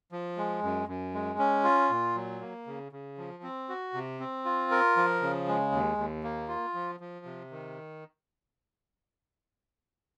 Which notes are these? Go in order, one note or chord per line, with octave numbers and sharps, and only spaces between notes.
F3
G#3
F#2
F#2
G#3
C#4
F4
A#2
F#3
A#3
C#3
C#3
F3
C4
F#4
C3
C4
F4
A#4
F3
C#3
G#3
D#2
D#2
A#3
F4
F3
F3
C3
D#3